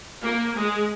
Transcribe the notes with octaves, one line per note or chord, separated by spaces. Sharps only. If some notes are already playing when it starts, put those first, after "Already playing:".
A#3
G#3